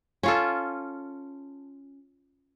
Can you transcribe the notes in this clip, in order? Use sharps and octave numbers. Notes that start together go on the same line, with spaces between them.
C#4 F4 A4